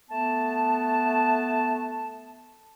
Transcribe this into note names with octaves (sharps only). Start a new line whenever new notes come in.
A3 B3 A5